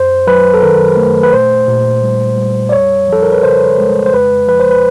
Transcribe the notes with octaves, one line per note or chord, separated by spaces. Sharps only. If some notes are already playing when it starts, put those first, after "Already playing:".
Already playing: F#2 C5
F#3 B4
A4
D#3 A#4
A3
B4
A#2 C5
A#2
G3
G3
D5
F2 C#5
F3 A4
A#4
B4
C#3 C5
G#3
C5
F2 B4
F3 B4
C5
B4